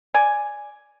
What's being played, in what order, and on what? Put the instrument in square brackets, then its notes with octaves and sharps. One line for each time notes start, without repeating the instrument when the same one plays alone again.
[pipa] D5 G#5